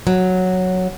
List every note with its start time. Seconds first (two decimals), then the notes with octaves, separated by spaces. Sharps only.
0.07 F#3